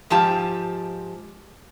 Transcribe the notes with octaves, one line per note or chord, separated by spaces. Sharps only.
G#2 F3 G4 A5